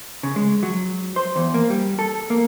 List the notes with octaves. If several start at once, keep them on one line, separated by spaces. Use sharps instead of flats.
C#3
G#3
F#3
C5
E2
A#3
G3
A4
A#3